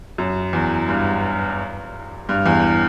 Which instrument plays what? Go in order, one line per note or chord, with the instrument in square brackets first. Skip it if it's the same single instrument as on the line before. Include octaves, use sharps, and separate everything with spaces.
[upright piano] F#2
E2
G2
G2
E2